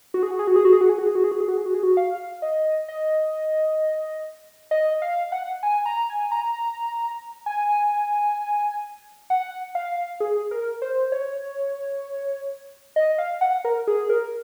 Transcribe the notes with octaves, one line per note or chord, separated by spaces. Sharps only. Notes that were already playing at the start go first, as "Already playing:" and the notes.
F#4
G#4
F#4
G#4
F#4
G#4
F#4
G#4
F#4
G#4
F#4
G#4
F#4
G#4
F#4
G#4
F#4
G#4
F#4
G#4
F#4
F5
D#5
D#5
D#5
F5
F#5
G#5
A#5
G#5
A#5
G#5
F#5
F5
G#4
A#4
C5
C#5
D#5
F5
F#5
A#4
G#4
A#4